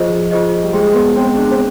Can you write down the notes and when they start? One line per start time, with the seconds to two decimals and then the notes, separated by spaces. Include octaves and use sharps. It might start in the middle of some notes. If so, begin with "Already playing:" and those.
Already playing: F3 F4 G#4 C5 D#5
0.31 F4 G#4 C5 D#5
0.63 G3
0.73 G#3 G#4 C5 G5 C6
0.94 B3
1.16 C4 G#4 C5 G5 C6
1.37 D4
1.51 C4